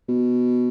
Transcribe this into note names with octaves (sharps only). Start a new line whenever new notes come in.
B2